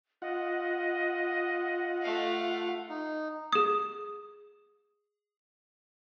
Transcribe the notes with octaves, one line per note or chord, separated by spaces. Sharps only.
F4 D#5 F#5
A3 F5
D#4
G#4 D#6